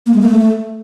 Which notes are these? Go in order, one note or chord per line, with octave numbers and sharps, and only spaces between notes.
A#3
G#3
A#3
A3